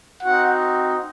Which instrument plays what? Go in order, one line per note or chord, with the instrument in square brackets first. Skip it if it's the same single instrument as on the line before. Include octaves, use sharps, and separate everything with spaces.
[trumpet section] C4 D#4 F#4 F#5